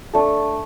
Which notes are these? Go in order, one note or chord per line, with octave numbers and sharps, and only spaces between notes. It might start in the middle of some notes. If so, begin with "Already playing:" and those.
A3 D4 A4